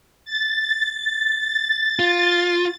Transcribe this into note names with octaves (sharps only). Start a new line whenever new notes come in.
A6
F4